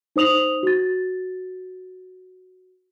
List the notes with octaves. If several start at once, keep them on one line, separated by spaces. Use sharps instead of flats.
D#4 C5 D#6 F7 F#7
F#4 A6